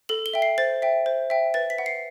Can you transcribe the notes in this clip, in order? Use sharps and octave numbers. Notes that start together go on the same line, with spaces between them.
A4 F#7
G7
E5 G5
C7
C5 A6
E5 G5
C5
E5 G5
B4 A6
B6
F#5
C7